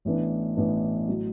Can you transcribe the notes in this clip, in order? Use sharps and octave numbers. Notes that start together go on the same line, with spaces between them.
A1 A2 E3 B3 D4
A1 A2 E3 B3 D4
A2 F#3